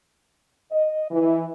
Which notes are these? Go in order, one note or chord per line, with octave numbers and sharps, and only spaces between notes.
D#5
E3